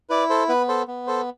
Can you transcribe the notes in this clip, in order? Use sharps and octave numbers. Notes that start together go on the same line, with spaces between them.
E4 B4 D5
A4 C5
B3 B4
A4 C5
B3
A4 C5